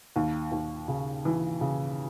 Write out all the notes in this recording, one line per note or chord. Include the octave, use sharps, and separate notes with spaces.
D#2
D#2
C#3
E3
C#3